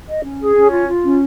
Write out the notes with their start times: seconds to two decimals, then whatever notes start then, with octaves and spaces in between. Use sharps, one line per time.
0.09 D#5
0.24 C#4
0.41 G#4
0.56 C#4
0.72 F4
0.87 F4
1.03 C#4